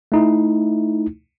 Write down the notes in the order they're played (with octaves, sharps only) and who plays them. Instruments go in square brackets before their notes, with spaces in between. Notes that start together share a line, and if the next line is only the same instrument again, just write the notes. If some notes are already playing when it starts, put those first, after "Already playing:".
[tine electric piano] A3 D#4 E4